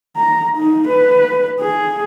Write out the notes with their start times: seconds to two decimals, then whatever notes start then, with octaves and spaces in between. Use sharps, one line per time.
0.17 A#5
0.57 D#4
0.88 B4
1.60 G#4